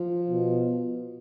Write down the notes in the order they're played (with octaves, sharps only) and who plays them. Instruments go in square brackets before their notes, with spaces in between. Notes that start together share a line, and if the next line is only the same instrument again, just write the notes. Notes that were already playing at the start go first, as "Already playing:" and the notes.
Already playing: [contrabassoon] F3
[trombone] B2